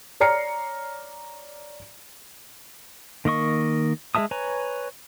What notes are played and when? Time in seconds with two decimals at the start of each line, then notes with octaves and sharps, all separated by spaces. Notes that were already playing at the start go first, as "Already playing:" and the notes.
0.20 C#5 D5 A#5 F6 C7 C#7
3.25 D#3 A#3 D#5 C#6
4.15 G#3 A4 E5 A5 D#6
4.31 B4 C#5 G#5 A#5